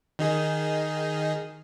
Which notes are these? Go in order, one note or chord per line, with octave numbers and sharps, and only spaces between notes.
D#3 D#4 G#4